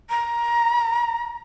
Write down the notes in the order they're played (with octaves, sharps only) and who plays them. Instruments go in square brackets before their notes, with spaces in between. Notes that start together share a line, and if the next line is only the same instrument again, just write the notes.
[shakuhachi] A#5